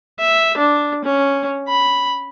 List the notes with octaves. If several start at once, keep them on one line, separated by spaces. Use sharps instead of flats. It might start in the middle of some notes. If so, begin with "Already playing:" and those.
E5
D4
C#4
B5